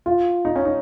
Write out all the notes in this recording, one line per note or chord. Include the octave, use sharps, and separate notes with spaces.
F4
D#4
C#4
D#4